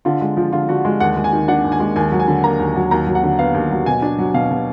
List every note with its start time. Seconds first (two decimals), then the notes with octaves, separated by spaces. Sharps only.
0.05 D3 F4
0.21 G#3
0.37 F3
0.53 D3 F4
0.69 D3 F#4
0.85 G#3
1.00 D#2 F#5
1.16 G#3
1.24 G#5
1.33 D#3
1.48 D4 F#5
1.64 D#2
1.72 G#5
1.80 G#3
1.96 D#2 G#5
2.12 F#3
2.20 G#5
2.28 D3
2.44 A#3 A#5
2.59 D#2
2.76 F#3
2.91 D#2 A#5
3.07 F#3
3.15 F#5
3.23 D3
3.39 B3 F5
3.54 D#2
3.71 F#3
3.86 B2 G#5
4.02 D4
4.18 F#3
4.34 B2 F5
4.51 B2